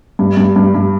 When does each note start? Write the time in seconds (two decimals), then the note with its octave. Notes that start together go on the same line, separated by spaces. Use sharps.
0.19 G2
0.37 G2
0.56 G2
0.74 G2